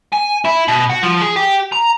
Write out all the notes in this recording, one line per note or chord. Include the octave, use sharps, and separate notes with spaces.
G#5
E4
B2
F#4
F3
G#4
G4
A#5